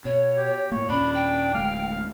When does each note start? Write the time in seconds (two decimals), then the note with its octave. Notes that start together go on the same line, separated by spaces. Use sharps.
0.05 B2 C#5
0.37 G4
0.72 A2 A#3 C#5
0.89 D#2 A#2 C#4 D4 B5
1.14 G5
1.54 D1 D2 G#3 F5